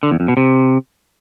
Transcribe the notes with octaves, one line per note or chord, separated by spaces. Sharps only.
D3
E2
F2
B2
C3